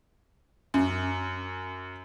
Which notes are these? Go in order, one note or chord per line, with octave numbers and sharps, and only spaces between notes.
F#2